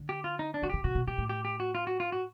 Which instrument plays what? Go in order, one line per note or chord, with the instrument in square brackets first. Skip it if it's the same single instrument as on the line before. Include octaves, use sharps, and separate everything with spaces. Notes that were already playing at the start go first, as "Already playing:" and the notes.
Already playing: [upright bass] D3
[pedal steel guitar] G4
F4
D#4
D4
[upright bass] D3 [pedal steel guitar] F#4
[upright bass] C#3 [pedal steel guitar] G4
[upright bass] C3 [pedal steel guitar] F#4
[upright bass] B2
[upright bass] B2 [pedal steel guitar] G4
[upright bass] A2
[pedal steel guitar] G4
G4
F#4
F4
F#4
F4
F#4